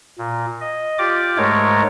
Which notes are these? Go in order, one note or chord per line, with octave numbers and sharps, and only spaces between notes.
A#2
D#5
F4 G4 D5 D6
G#2 G#3 A3 A#4 C#5